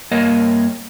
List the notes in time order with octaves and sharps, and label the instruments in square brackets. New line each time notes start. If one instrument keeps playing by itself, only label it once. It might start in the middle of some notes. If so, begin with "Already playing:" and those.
[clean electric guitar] G2 A#3 A#4 C#5 D#5